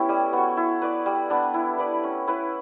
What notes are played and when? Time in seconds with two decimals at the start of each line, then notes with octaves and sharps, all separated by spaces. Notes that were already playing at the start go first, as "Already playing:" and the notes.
Already playing: B3 C#4 E4 G4 A4
0.09 G3
0.33 B3 F#4
0.57 E4
0.82 B4 D5
1.06 G3
1.30 B3 D4
1.54 E4
1.78 B4 D5
2.04 C#4
2.27 E4 B4